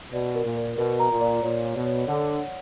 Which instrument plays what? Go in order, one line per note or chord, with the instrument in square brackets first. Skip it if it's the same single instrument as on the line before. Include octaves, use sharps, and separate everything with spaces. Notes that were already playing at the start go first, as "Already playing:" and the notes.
[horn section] B2 [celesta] D5
[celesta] A#4
[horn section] A#2
[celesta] A#4
[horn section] B2 [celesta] A#4
[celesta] A#5
[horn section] A#2
[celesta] D5
[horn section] A#2 [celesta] C#5
[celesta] C#5
[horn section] B2
[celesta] C#5
[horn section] D3 [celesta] F#5
[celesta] F#5